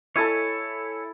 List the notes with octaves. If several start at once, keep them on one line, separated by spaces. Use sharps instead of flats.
E4 A4 C#5 E5 G#5